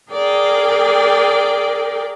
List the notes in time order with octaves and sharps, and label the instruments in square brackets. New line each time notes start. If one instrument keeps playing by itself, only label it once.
[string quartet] G#4 A#4 D5 G5